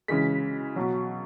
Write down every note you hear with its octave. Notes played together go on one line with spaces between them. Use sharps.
C#3 E3 G#3 B6
B2 F#3